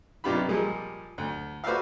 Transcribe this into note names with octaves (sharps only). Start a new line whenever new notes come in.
B1 C3 D4 F4 G4 B5
A#2 F3 G3 G#3
D2
F#4 B4 C5 D5 E5 F5